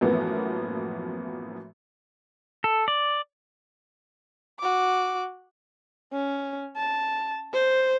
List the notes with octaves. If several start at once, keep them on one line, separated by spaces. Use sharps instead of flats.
F#2 A2 E3 F3 A#3 B3
A4
D5
F#4 D6
C#4
A5
C5